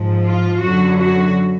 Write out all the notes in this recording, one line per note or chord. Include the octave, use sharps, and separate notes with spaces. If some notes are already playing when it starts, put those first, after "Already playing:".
Already playing: G#2 F3
F4
F#2 D3 F#3 F#4
F#4